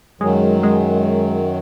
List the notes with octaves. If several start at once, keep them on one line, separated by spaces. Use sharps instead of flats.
F#2 D#3 F#3 G#3
G#3